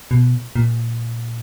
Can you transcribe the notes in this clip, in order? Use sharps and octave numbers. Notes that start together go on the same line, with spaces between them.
B2
A#2